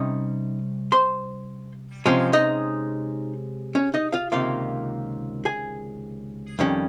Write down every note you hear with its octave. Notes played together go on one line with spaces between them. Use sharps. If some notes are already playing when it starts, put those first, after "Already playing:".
Already playing: C3 G3 C#4 D#4 D#5
C5 C6
C3 F3 G#3 C#4
D#4 D#5
C#4 C#5
D#4 D#5
F4 F5
C#2 C3 D#3 A#3 F4 F5
G#4 G#5
F2 D#3 G3 C#4